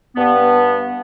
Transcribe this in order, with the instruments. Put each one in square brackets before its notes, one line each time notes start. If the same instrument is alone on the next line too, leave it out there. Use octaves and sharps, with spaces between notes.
[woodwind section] G2 B3